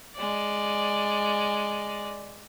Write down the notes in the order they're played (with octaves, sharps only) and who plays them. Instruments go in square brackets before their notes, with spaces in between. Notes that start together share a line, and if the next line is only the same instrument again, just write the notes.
[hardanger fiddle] G#3 D5